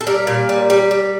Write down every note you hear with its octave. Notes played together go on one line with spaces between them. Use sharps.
A4
G3 A#4
A#2
G3
G3
G3